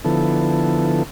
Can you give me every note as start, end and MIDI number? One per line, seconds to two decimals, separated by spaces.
0.05 1.03 50
0.05 1.03 53
0.05 1.03 59
0.05 1.03 64
0.05 1.03 69